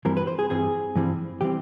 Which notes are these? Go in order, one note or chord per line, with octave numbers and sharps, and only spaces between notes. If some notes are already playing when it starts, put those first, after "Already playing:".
G2 E3 G3 C4 A#4
B4
C5
G#4
G2 E3 G3 C4 G#4
G2 E3 G3 C4
E3 G3 C4 G4